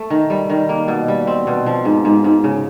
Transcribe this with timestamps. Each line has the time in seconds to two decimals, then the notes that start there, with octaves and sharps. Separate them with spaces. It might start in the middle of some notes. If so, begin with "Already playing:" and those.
Already playing: A3
0.10 D#3
0.30 G3
0.50 D#3
0.69 A#3
0.88 B2
1.08 G3
1.27 C4
1.47 B2
1.66 F3
1.85 G#2
2.05 G#2
2.24 G#2
2.44 C#3